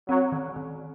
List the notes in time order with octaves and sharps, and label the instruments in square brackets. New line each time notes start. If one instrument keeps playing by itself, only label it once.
[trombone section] F#3 [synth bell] C4
[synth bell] D#3
D#3